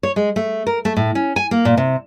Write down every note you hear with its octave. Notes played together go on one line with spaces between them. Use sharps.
C#5
G#3
A3
A#4
A3
A2
C#4
G#5
A#3
A#2
C3